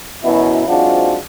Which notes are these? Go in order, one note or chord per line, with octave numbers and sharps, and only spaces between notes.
F#2 B2 E3 E4
G#2 F#3 C4 D4 F4 F#4